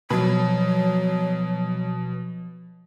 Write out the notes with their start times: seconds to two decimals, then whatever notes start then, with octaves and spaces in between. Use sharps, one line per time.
0.10 B2 F3 F#3 B5